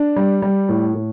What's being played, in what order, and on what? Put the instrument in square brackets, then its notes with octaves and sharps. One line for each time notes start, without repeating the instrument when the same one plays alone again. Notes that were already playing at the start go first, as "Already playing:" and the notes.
Already playing: [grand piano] D4
G3
G3
A2
A2